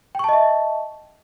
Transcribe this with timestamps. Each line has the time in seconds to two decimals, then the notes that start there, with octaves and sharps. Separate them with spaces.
0.15 G5
0.19 C#6
0.24 A5
0.29 D#5
0.33 E5